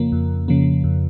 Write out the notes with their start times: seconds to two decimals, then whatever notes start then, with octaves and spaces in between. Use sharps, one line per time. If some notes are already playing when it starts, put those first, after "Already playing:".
Already playing: F2 C#3 F3 A#3
0.12 F2
0.48 C#3 F3 A#3
0.84 F2